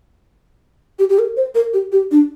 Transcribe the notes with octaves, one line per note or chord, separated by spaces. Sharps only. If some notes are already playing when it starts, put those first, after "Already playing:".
G4
G4
A#4
C5
A#4
G4
G4
D4